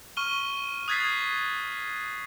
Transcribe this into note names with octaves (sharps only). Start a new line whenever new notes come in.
C#6 F6 D#7 G7
D#6 F#6 G#6 A6 B6 C7